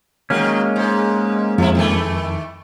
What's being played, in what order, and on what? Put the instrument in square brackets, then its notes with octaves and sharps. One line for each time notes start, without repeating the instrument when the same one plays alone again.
[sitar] D#3 F#3 [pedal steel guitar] G#3 A#3 C#4
[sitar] G#2
[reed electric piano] F2 [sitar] F3 E4
[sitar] D#3 E3 A3